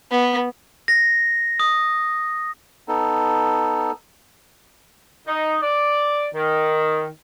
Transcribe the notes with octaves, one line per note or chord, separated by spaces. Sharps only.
B3
A#6
D#6
B3 D#4 A4
D#4
D5
D#3